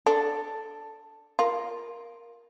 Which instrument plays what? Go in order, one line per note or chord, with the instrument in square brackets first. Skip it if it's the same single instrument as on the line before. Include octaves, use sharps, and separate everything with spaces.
[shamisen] D4 [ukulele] A4
[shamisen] F4 [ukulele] A#4